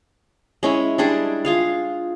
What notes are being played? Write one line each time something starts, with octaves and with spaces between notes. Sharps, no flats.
G#3 C#4 E4
G3 G#3 D4 G#4
F4 G#4 F5